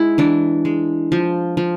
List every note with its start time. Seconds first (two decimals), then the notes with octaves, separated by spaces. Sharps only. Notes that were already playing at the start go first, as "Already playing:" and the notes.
Already playing: G#3 E4
0.18 E3 D4
0.65 G#3
1.12 F3
1.57 F3